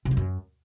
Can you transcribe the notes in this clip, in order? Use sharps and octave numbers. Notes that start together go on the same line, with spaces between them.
C3
F#3
F#2